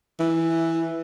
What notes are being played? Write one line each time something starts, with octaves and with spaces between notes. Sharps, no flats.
E3